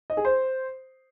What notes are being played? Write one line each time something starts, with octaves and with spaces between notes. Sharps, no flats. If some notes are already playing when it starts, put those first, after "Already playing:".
D#5
G#4
C5